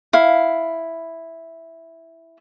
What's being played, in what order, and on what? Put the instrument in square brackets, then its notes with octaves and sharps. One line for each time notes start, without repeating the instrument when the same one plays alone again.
[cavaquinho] E4 F5